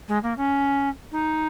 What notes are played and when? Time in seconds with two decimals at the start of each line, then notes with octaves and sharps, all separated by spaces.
0.08 G#3
0.23 A#3
0.37 C#4
1.12 D#4